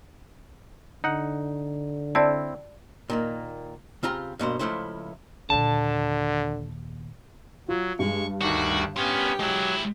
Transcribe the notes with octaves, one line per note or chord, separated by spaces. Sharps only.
D3 D#4 F#5
C4 E4 D5 A5
A#2 D#3 A#3
C#3 C4 F4 G4 A#5
G2 B2 A#3 C5
C#2 C#3 F3 A3 E4 C5
D#2 A#2 D3 A5
F#3 F4
G2 G#3 C#6
D2 D#3 G3 D4 F#4
B3 C#4 G4 A#4 C6
F#3 G#3 E4